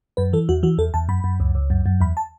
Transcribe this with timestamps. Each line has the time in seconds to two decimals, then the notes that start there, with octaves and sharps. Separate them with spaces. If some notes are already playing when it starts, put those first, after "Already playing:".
0.17 F#2 B4
0.33 E3 A4
0.49 E2 F#4
0.63 E3 F#4
0.78 E2 A4
0.94 E2 A5
1.09 F#2 B5
1.24 F#2
1.40 C#2
1.55 C#2
1.70 F#2
1.86 F#2
2.01 E2 B5
2.17 A5